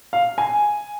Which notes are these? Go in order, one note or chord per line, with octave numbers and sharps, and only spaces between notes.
F5
G#5